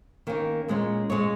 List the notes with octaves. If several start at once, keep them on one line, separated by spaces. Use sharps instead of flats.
D#3 A#3 C#4
A#2 G#3 C#4
A#2 G#3 C#4 C#5